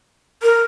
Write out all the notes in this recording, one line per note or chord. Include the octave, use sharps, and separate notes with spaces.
A#4